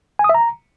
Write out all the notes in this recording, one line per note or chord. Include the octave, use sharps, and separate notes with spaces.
G#5
D#6
E5
A#5